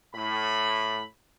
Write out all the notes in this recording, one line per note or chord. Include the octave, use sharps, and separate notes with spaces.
A2 B5